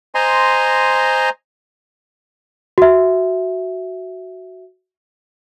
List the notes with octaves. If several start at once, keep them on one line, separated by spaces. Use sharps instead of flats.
C5 D#5 G#5 A#5 C6
F#4 E5